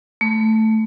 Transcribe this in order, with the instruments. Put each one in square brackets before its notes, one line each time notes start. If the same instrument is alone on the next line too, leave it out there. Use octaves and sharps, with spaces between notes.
[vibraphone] A3